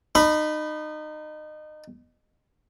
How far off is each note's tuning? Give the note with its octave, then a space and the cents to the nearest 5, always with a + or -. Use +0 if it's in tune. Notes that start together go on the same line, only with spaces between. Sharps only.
D#4 -25 B5 +0